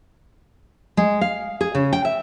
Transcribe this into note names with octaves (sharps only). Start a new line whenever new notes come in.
G#3
F5
G#4
C#3
G5
E5